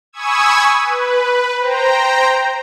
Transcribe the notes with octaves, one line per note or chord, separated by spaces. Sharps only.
G#5 B5 C#6 D#6 E6 G#6
B4
C5 G5 A#5